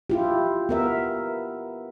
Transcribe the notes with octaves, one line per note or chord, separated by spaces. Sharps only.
E4 F4 G4
B3 A#4 E5